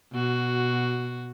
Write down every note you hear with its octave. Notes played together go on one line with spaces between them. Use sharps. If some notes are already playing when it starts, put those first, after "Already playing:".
B2 F#4